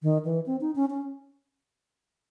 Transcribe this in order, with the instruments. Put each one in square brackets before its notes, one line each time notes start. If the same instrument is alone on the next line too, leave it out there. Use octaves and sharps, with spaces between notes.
[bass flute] D#3
E3
C4
D#4
C#4
C#4